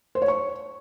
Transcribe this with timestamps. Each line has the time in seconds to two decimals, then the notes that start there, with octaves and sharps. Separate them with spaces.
0.15 C5
0.22 C#5
0.28 C#6